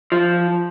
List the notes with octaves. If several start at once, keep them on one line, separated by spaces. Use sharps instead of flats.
F3